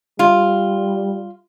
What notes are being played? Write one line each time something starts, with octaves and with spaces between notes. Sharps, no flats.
G3 F4